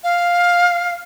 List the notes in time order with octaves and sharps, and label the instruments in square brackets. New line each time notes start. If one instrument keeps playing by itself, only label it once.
[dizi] F5